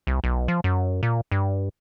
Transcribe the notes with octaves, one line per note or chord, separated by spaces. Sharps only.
C2
B1
F3
F#2
A#2
G2